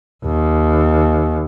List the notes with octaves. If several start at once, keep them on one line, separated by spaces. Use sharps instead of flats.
D#2